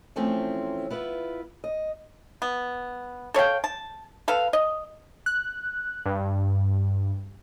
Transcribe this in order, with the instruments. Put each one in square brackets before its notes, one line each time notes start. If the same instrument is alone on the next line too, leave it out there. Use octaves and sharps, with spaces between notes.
[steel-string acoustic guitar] E3 F3 A3 C4 C#4
B3 E4 F4 B4
D#5
[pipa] B3
A4 C#5 F5 G5
A5
A4 B4 F5
D#5
[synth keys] F#6
G2